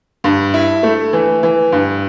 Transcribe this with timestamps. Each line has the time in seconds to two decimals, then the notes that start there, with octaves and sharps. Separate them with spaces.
0.24 G2
0.54 E4
0.83 A3
1.13 E3
1.43 E3
1.72 G2